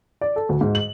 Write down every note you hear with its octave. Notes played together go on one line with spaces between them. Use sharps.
D5
A4
D2
G#2
F#7